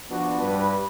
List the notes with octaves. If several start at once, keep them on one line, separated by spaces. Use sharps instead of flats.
F3 B3 D4 F#4
G2 B4